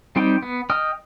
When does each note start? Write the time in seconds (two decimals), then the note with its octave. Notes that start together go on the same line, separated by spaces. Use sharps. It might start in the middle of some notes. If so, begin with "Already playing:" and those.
0.16 G3 C4 D#4 G4 G5
0.43 B3
0.70 D#5 G5 D#6 F6